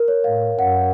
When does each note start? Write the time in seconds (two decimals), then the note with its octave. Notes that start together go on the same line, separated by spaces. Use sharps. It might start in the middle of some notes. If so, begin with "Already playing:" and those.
Already playing: A#4
0.08 C#5
0.24 A2 F5
0.59 F#2 F#5